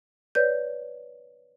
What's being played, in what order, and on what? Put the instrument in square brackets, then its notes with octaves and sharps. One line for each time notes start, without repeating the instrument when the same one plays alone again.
[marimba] B4 C#5 D5 G6